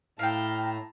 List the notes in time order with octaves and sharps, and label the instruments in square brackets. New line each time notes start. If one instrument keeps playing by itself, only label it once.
[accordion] A2 [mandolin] F5 G5 [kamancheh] A5 A#5